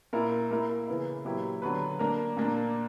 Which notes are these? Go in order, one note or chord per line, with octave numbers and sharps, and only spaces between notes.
A#2 A#3 E4 A#4
A#3 E4 A#4
C#3 E3 B3 E4
A#2 F#3 B3 E4 G4
D3 F#3 B3 F#4 B4
A#3 D4 A#4
A#2 A#3 D4